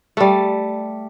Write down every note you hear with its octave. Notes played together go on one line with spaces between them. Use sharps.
G3 A3